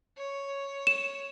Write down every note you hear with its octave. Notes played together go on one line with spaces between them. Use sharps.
C#5
E7